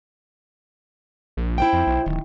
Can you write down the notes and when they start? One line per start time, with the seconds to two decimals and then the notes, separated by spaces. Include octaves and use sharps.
1.37 A#1
1.58 E4 C5 G5
1.73 F2
1.87 B1
2.06 D1 D#3